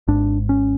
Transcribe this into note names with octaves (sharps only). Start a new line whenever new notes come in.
G#1 G#2 D4
C#4